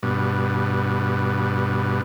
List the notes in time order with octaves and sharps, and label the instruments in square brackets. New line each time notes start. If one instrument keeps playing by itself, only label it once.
[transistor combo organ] G2 B2